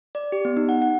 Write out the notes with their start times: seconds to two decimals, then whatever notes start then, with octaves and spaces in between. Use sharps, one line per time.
0.15 D5
0.32 G4
0.45 B3
0.57 D#4
0.69 F#5
0.82 F#5